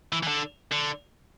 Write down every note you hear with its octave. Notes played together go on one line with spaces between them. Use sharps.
E3
E3
D3
D3